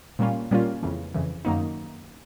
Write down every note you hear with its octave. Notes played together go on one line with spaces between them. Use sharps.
A#2 G3 A#3 C#4 F4
A#2 G3 A#3 C#4 F4
F2 C#3 E3
F2 C#3 E3
F#2 D#3 F#3 A#3 D#4